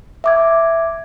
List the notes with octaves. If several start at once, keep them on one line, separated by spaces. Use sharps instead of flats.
E5 D6 G#6